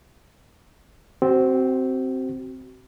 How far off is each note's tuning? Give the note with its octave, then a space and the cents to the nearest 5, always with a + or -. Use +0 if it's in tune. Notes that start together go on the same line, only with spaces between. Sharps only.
C4 +0 F#4 +35